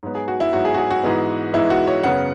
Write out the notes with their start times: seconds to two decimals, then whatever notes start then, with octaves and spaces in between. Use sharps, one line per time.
0.03 G#2 F#3 B3
0.15 G#4
0.28 F#4
0.40 E4
0.53 G#2 F#3 B3 F#4
0.65 G#4
0.74 F#4
0.78 G#4
0.91 F#4
1.03 G#2 E3 G#3 B3
1.53 G#2 E3 G#3 B3 E4
1.70 F#4
1.87 C#5
2.03 F#2 C#3 F#3 B3 F#5